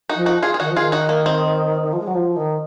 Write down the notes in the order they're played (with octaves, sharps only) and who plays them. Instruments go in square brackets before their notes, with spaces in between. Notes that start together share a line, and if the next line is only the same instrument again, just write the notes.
[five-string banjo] D#4 F#4
[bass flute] F3
[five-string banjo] D#4 F#4
F4 G#4
G#4
[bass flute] D#3 [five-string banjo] D#4 F#4
[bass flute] F3
[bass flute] D#3 [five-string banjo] F4 G#4
[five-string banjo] D#4 F#4
A#3
C4
[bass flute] D#3
F3
G#3
F#3
F3
D#3